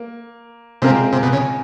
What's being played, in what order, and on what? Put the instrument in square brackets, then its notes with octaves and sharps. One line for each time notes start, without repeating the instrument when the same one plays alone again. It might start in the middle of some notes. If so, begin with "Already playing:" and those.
Already playing: [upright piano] A#3
[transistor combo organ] C3 [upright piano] G#3 C4 F4 A#4
[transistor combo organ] C3
B2
C#3